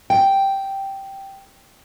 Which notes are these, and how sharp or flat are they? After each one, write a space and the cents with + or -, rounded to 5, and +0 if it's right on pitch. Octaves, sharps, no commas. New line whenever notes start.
G5 -5